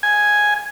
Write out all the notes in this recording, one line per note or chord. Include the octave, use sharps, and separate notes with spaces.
G#5